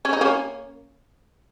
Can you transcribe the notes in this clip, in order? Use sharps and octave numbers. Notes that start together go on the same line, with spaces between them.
C#4
D#4
A#3 C#4